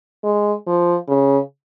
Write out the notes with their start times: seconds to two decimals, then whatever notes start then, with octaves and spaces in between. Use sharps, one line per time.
0.24 G#3
0.67 F3
1.09 C#3